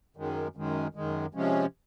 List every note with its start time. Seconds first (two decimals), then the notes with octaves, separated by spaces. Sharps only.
0.16 F#2 D#3 G#3
0.55 F#2 D#3 G#3
0.95 F#2 D#3 G#3
1.34 C3 F3 G#3 C#4